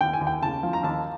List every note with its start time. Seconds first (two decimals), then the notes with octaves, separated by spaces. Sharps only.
0.01 D#2 G5
0.13 G#5
0.21 D#2
0.27 G5
0.42 C#3 A5
0.63 F3
0.73 A#5
0.83 D#2 A5